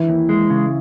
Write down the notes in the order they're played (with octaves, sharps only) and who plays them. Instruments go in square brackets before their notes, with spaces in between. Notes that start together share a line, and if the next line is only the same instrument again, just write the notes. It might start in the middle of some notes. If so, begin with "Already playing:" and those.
Already playing: [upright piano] E3 E4
[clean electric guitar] D#2
G#3
C#3